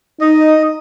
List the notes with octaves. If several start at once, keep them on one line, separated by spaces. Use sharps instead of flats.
D#4 D#5